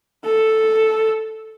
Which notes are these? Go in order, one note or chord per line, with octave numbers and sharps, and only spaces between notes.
A4